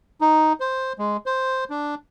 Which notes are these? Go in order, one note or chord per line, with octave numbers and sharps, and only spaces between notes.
D#4
C5
G#3
C5
D4